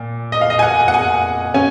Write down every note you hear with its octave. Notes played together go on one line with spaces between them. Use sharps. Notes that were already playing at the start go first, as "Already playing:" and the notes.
Already playing: A#2
D#5
F5
D#5
G#5
F#5
F#5
G#5
C#4 G#5